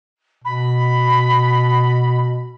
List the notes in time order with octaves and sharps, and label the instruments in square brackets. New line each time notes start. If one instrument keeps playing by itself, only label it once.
[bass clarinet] B2 [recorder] B5